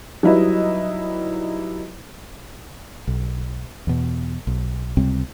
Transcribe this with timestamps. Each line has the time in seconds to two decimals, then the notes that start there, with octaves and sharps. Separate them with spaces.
0.23 F#3 G3 D#4 E4 B4 D#5
3.07 B1
3.87 E2 B2
4.47 B1
4.97 C#2 C3 G3 C4